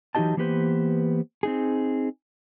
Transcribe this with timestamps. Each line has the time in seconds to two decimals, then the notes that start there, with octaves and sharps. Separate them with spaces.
0.15 E3 F#3 D#4 G4 D#5 A5
0.37 E3 A#3 B3 G4 B4 C5
1.43 C4 D#4 G#4